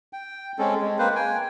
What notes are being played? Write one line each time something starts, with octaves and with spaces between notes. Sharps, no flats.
G5
G#3 C4 C#4 A4
G#3
A#3 C4 B4 C5
G5 G#5